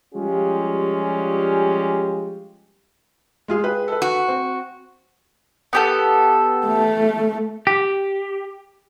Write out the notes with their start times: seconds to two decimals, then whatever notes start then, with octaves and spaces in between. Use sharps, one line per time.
0.15 F3 G3 G#3 C#4 F4 G4
3.48 G#3 F4 G#4
3.64 G#4 B4 G5
3.88 A4 B4
4.02 F#4
4.28 C4
5.73 B3 G4 A4
6.66 A3
7.67 G4